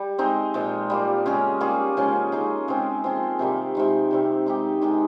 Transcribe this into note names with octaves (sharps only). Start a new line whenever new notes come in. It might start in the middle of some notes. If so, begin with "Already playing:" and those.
Already playing: G3
G#3 C4 D#4
A#2 F3 G#3
G3 A#3 F4
C#3 G#3 C#4 G#4
G3 A#3 F4 G#4
C#3 F3 G#3 C#4
G#3 D#4 G#4
C#3 G#3 C4
F3 G#3 C4 F4
C3 D#3 G3 A#3
C3 D#3 G#3
C3 G3 C4
G#3 D#4 G4
D#3 G#3 D#4 G4